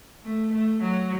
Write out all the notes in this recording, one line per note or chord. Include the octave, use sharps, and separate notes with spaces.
A3
A3
F#3